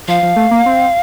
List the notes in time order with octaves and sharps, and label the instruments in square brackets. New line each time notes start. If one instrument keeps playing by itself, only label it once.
[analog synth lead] F3 [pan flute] F5
[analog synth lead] F3
A3
A#3
C4